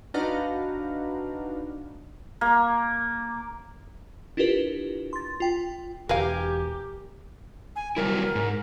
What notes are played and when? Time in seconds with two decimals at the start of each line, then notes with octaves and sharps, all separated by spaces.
0.14 D4 D#4 F#4 B4 F5 A#5
2.41 A#3
4.37 D4 E4 F4 G4 A#4 B4
5.13 C6 A6
5.40 F4 G5
6.09 E1 G4 A#4 B4 F5 G#5 A#5
7.76 G#5
7.97 F#3 G3 E4 A#4
8.35 G#2